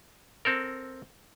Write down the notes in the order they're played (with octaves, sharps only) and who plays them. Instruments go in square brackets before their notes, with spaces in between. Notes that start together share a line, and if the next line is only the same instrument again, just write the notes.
[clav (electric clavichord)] C4 A4 A#4